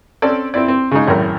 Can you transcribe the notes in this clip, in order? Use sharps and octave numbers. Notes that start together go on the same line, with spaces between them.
C4 C#4 A4 D5
C4 E4 D5
C4
C#3 G#3 D#4
G#1 F#2 A2 A#4 A#5